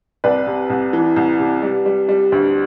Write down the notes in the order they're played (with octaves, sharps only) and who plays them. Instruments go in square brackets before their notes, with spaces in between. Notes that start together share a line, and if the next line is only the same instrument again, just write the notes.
[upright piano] C2 B4 D5
C3
C2
E3
C2
C3
G3
G3
G3
D2